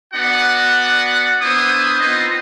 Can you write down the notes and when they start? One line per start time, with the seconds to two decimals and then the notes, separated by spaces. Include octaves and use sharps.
0.13 B3 D4 F#4 D5 F#5
1.41 B3 D4 E4 C5 D#6
1.99 B3 C4 D#4 F4 C5 D#5